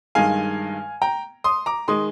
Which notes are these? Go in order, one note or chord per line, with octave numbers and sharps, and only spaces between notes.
G2 D#3 G#3 F5 G#5
G5 A#5
C6 D#6
A#5 D6
D#3 G#3 C6 D#6